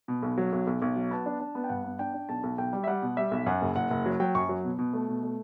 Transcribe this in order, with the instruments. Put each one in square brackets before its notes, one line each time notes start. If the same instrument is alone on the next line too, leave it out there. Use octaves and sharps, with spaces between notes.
[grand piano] B2
B1
F#3
B1
B1
B1
F#3
B3 A5
D4
D4
B3
G5
G2 F#5
B3
D4 G5
D4
B1 A5
B1
B1 G5
G3
E5
G3 F#5
B2
G3 E5
B1
F#2 F#5
F#1
F#1 F#5
F#1
F#3
F#3 G5
F#2 C#6
F#3
B2
B2
A3
B2
A3